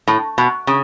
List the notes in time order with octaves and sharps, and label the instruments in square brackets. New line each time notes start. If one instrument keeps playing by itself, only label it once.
[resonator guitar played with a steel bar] A2
B2
C#3